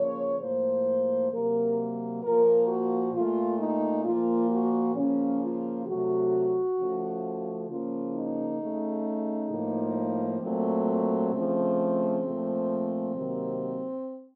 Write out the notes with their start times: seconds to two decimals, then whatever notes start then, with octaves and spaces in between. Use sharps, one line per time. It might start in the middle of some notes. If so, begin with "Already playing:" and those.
Already playing: C#3 F3 A#3 C#5
0.40 A2 F3 A#3 C5
1.31 C3 F#3 A#3 A#4
2.22 A#2 F3 A#3 A#4
2.67 F#4
3.13 A#2 A3 F4
3.59 D#4
4.05 A#2 F3 A#3 F4
4.51 F#4
4.95 C#3 F3 A#3 C#4
5.40 F4
5.86 C3 F#3 A3 F#4
6.77 C#3 F3 A3
7.68 C#3 F3 A#3 F4
8.14 D#4
8.60 C#3 A3
9.50 A2 F3 A#3
10.42 A#2 F#3 A3 C4
11.33 C#3 F3 A3
12.24 A#2 F3 A3
13.15 C3 D#3 F#3 A#3